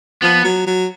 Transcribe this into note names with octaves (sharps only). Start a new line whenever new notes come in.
F3 B3
F#3
F#3